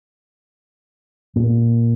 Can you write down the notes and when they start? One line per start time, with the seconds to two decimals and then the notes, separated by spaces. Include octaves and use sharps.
1.36 A#2